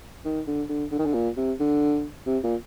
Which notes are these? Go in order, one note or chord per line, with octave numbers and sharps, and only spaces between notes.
D#3
D3
D3
D3
D#3
D3
A#2
C3
D3
C3
A#2